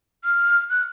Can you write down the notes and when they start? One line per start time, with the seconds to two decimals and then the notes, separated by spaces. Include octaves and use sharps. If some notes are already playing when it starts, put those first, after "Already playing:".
0.24 F6
0.70 F#6